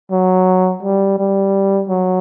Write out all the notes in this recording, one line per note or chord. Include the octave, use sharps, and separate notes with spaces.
F#3
G3
G3
F#3